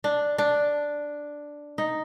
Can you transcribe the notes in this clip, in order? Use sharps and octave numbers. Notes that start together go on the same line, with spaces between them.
D4
D4
D#4